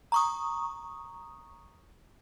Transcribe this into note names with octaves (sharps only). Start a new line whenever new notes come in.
A#5 C#6 D#6